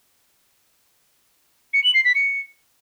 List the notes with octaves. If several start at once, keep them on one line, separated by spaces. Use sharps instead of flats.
C#7
F#7
C7
B6
C#7